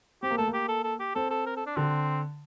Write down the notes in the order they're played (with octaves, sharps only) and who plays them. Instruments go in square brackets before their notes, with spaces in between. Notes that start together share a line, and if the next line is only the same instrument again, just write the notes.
[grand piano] C4 [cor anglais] G4
[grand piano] A#3
[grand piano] A3 [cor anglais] A4
[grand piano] A#3
[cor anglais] G4
A4
A4
G4
[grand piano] C4 [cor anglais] A4
[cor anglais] A4
A#4
A4
D4
[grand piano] D3 [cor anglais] C4